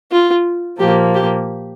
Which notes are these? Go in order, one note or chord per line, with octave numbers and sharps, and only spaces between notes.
F4
A#2 F3 A#3 G4
G4